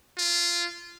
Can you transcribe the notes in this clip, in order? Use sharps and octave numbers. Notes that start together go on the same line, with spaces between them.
F4